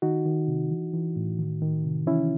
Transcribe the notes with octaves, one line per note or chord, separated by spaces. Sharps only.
D#3 D#4 F#4
D#3
C3
E3
E3
A2
D#3
D#3
C3
E3 C#4 E4